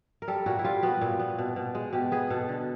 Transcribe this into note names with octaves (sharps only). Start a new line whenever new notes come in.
A#4
G3 A4
A#2 F#4
E4
G3 F4
B3 F#4
A#2
B3
B2
B2
G#3
B2 G4
B3 G#4
B2 A4
D3